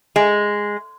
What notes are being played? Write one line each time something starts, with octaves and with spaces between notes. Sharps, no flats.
G#3